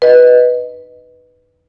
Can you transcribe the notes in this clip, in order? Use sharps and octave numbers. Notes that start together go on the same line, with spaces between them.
B4 D#5